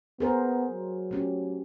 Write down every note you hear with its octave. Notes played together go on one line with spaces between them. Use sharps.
B3 G#4 A#4 C5
F#3
A3 C#4 G4